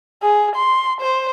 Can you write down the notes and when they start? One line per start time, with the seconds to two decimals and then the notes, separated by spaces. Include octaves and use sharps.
0.22 G#4
0.56 C6
1.01 C5